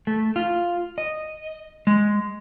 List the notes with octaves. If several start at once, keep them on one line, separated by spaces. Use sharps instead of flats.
A3
F4
D#5
G#3